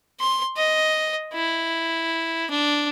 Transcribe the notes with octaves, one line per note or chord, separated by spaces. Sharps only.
C6
D#5
E4
D4